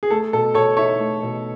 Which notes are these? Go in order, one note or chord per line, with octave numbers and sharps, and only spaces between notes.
G#4
A3 A4
B2 A4
B2 A4 C#5
D#4 C#5 E5
A3
B2